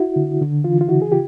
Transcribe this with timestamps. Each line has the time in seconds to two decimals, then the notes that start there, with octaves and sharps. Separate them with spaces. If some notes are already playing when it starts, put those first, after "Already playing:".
Already playing: E4 F#4
0.16 D3
0.41 D3
0.64 E3 F4
0.81 F4
0.88 C#3 E4 F#4
1.02 G#4
1.12 C#3 F4 G4